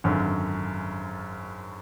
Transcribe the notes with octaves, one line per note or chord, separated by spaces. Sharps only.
G#1 F#2 D3